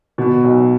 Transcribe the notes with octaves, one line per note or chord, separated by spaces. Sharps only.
B2
B1